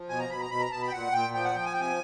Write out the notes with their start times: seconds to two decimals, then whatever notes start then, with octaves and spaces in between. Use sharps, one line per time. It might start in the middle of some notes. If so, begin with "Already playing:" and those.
Already playing: F3
0.09 B2 G#5
0.19 A#5
0.29 B2 B5
0.39 A#5
0.50 B2 B5
0.60 A#5
0.71 B2 A5
0.82 B5
0.87 G5
0.92 A#2 F#5
1.12 A#2 G5
1.33 F3 G5
1.45 F#5
1.54 F3 G5
1.65 G#5
1.73 C3 G5
1.81 G#5